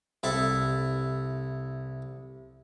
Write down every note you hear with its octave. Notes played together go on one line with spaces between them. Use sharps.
C2 E4 A4 E5 A5